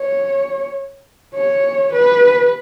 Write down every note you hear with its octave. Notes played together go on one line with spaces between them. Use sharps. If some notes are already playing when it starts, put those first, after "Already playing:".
Already playing: C#5
C#5
B4